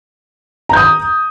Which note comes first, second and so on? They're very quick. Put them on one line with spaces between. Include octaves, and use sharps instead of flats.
A#5 G6 D#6